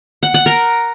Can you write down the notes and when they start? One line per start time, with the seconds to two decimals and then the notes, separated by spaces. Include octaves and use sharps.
0.23 F#5
0.34 F#5
0.46 A#4